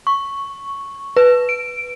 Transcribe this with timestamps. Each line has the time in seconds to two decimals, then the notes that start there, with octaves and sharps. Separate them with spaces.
0.07 C#6
1.17 B4
1.49 D7